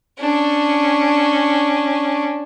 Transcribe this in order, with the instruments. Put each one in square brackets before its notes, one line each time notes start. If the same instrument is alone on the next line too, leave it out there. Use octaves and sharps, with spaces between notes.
[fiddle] C#4 D4